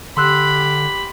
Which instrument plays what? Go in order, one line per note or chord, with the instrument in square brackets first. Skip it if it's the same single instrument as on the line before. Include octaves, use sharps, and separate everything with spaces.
[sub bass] D3 [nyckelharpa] G4 B5 [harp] C6 E6 F#6